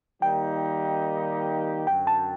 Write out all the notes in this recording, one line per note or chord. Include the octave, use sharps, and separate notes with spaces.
D#3 G3 A#3 D#4 G4 G5
F#2 D3 F#3 G5
A5